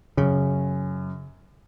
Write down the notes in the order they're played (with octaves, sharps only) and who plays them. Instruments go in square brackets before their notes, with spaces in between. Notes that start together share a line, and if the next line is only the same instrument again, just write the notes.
[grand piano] F#2 [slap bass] C#3